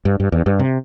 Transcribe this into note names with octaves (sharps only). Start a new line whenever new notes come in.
G2
G2
E2
G2
C3